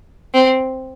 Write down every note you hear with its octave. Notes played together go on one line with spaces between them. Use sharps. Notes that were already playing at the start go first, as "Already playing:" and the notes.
C4